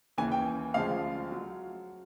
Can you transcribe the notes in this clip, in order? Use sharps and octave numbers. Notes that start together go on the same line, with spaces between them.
D#2 C#3 E3 G#5
G5
D2 C#3 F3 G#3 F5
F#3